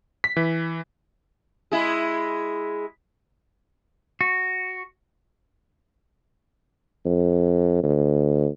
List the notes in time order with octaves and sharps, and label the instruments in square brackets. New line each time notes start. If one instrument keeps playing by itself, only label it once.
[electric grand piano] B6
E3
[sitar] G#3 E4 G#4
[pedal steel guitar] F#4
[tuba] F2
D2